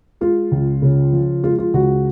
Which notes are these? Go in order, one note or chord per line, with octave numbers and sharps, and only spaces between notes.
G#3 F4
C#2
C#3
F3
G#3 F4
F4
C#2 F#4